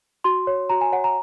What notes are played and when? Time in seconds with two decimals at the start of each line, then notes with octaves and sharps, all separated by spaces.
0.24 F#4 C6
0.47 C#5
0.69 F#4 A#5
0.81 G#5
0.92 C#5 F#5
1.04 A#5